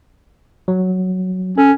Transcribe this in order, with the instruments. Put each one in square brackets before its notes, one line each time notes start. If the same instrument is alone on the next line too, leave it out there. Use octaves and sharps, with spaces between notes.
[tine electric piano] F#3
[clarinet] C#4 [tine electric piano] A4